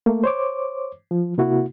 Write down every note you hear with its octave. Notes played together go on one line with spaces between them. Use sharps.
A3 A#3
C5 C#5 D6
F3
C3 A#3 E4 F#4